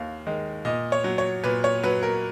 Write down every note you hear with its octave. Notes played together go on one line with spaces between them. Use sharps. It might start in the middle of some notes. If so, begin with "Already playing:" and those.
Already playing: D#2 D#3 F5
D#3 G#3
A#2 D#5
C#5
F#3
C#5
A#2 B4
C#5
F#3 B4
A#4